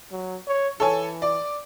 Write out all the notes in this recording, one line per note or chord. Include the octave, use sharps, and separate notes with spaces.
F#3
C#5
E3 A4 C#5 G#5
D5